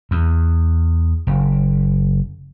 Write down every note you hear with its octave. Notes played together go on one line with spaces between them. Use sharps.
E2
F#1